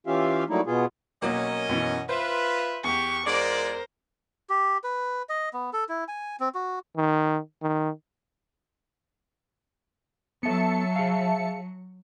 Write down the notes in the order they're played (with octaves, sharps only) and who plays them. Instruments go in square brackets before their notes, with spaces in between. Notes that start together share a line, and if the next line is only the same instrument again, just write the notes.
[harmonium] E3 C#4 F4 G4 E5 F5
F#3 G3 A3 A#3 D#4 E4
B2 B3 F4 G#4
[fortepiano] B1 F#3 A#3 [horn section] C#4 A#4 D#5
[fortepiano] F#2 B2 E3
[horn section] F4 B4 [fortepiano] C5 [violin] E5
[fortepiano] E2 [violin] G4 C#6
[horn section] G#3 F4 D5 [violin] A#4 C5
[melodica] G4
B4
D#5
B3
A4
E4
G#5
C4
F#4
[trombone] D#3
D#3
[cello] F#3 [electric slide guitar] B3 A4 [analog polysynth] E5 A5 C#7
[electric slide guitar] G#4 F5